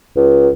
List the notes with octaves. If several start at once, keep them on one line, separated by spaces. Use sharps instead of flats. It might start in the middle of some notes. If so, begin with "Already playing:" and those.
C#2